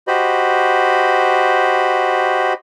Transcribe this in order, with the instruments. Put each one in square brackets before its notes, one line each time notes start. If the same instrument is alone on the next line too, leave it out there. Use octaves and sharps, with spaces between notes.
[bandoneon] F#4 G4 C5 D#5 B5